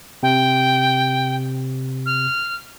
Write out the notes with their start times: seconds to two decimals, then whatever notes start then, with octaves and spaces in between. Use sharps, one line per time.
0.23 C3 G5
2.06 F6